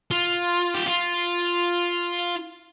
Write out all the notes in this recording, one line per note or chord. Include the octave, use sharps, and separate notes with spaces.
F4
G4
F4